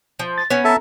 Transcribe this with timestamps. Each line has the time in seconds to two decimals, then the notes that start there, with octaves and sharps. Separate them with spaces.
0.19 F3
0.38 A6
0.50 B3 C#4 C#5
0.65 A4 E5 A5 A#5